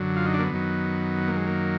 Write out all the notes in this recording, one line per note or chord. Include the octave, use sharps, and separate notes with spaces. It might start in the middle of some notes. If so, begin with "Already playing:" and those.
Already playing: F#2 D3 F#3
F4
D#4
D4
A#3
B3
F#2 D#3 F#3
A#3
G#3
A#3